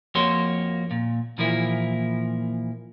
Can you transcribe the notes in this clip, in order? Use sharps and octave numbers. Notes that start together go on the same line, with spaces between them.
F2 A#3 F#4 C#5 C6
A#2
A#2 E3 F3 A#3 E4